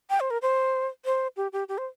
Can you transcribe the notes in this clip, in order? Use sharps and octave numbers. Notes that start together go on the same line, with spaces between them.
G5
C5
A#4
C5
C5
G4
G4
G4
C5